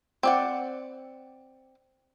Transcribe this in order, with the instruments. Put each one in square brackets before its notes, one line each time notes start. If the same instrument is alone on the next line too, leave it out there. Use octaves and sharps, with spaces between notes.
[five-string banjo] C4 D5 F#5